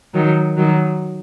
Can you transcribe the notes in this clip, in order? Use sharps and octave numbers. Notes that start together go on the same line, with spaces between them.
D#3 F#3
D#3 F#3